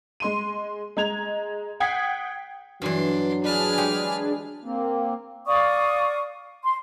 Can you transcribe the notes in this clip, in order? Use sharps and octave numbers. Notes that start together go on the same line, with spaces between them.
G#3 C6 D#7
G#3 A#5 G#6 F7
F#5 G5 D#6 G#6 B6 C7
G2 E3 F#3 D4 C6
D4 G#4 B4 F6
G#3 G4
A#3 C4
D5 F5 C#6 D#6
C6